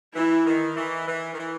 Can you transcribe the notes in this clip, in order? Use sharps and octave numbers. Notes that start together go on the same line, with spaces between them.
E3 E4
D#3
E3
E3
D#3
E3